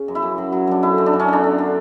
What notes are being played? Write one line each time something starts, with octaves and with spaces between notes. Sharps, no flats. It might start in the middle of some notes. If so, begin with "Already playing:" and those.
Already playing: C#3
F#2
E4
F#2
F#3
F#3
F#2 D4
D3 E4
F#2
D4
F#2
C#4
D3 D4
D3
D3